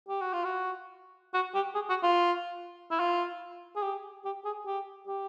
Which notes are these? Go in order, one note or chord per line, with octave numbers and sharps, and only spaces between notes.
G4
F#4
F4
F#4
F#4
G4
G#4
F#4
F4
E4
F4
G#4
G4
G4
G#4
G4
G4